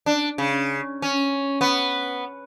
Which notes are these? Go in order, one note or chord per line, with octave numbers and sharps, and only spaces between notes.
D4
C#3
C#4
B3